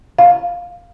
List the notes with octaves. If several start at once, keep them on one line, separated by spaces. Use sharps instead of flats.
F5